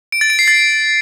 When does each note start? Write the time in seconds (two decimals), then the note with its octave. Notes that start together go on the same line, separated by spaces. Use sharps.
0.12 D7
0.21 A6
0.30 D7
0.39 C7
0.48 A6